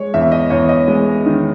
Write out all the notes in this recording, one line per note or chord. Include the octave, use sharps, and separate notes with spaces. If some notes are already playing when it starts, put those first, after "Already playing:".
Already playing: G#3 C#5
E2 E5
D#5
E2 C#5
D#5
G#3
D#3